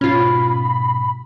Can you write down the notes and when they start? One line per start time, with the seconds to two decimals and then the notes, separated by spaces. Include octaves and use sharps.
0.01 G#2 B2 C#4 F4 B5